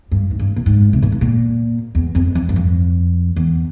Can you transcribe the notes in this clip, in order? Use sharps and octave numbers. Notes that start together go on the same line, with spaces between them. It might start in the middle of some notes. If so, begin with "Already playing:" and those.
G2
G#2
G2
A#2
G#2
C3
A#2
G#2
A#2
E2
F2
F2
G2
F2
E2